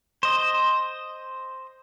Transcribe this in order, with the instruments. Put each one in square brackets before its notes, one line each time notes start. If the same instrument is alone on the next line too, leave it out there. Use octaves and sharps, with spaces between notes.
[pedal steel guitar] C5 D#5